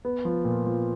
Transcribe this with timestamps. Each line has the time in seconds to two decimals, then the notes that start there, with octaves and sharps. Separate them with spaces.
0.05 B3
0.25 F3
0.45 A#2
0.66 F3